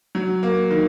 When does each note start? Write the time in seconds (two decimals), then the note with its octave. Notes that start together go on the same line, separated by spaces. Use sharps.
0.15 F#3
0.43 A#3
0.71 D#3